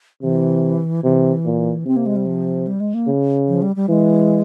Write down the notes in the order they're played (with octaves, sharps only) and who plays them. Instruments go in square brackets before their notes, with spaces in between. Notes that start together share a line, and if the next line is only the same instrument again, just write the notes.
[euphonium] C3 [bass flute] E3
[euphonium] C3 [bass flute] E3
[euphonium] A#2
[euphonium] C3 [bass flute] C4
[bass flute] A#3
G#3
G3
F3
G3
G#3
A#3
[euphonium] C#3
[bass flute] F3
G3
G3
[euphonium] E3 [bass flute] G#3